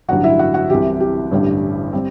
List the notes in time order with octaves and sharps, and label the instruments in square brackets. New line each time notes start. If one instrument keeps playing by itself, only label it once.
[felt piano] A1 G2 D3 F#3 F#4 F#5
E4 E5
F#4 F#5
F#4 F#5
C2 C3 E3 G4
G4
A1 G2 D3 G3
G3 C4